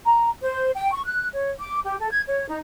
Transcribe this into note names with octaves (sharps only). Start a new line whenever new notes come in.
A#5
C5
G5
C#6
F#6
C#5
D6
G4
A4
G#6
C#5
D#4